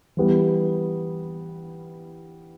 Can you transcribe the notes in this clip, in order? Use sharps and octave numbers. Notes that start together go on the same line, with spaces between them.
E3 G3 B3